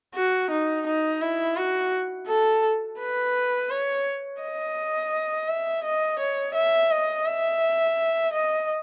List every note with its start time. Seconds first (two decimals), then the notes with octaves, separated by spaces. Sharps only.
0.15 F#4
0.50 D#4
0.86 D#4
1.22 E4
1.57 F#4
2.28 A4
2.99 B4
3.70 C#5
4.41 D#5
5.48 E5
5.84 D#5
6.19 C#5
6.55 E5
6.91 D#5
7.26 E5
8.33 D#5